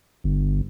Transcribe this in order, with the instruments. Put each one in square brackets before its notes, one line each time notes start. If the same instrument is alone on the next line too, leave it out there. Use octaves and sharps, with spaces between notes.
[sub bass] G1